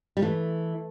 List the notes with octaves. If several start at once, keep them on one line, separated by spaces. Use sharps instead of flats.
G3
E3 A3